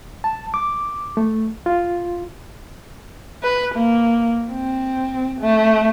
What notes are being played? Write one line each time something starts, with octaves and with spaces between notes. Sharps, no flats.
A5
D6
A3
F4
B4
A#3
C4
A3